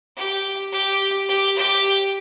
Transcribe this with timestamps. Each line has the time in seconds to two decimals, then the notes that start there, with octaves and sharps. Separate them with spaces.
0.17 G4
0.72 G4
1.29 G4
1.57 G4